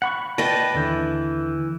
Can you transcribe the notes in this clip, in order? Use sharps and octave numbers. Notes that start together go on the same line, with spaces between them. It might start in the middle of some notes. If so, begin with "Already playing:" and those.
F#5 B5 C#6
B4 D5 D#5 G5 A5
D#2 D3 E3 G6